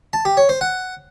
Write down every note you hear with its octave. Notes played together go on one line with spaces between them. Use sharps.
A5
G4
C#5
C5
F#5